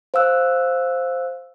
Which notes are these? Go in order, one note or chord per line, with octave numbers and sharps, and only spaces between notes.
C5 F5 E6 F#6